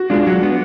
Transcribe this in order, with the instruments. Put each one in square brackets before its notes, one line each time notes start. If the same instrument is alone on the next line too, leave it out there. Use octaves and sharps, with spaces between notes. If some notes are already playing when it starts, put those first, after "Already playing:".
Already playing: [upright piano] F#4
[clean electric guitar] G#3 D4 [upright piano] F4
[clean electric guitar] F#3 [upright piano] F#4
[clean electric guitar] B3 D4